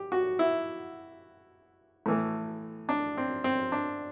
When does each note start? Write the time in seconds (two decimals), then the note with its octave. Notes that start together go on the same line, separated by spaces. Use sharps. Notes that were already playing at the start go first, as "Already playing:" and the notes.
Already playing: G4
0.12 F#4
0.39 E4
2.06 A2 E3 A3
2.89 D4
3.17 C4
3.44 C4
3.72 D4